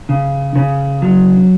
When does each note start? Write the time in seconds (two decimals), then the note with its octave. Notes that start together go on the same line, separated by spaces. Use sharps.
0.09 C#3
0.56 C#3
1.02 F#3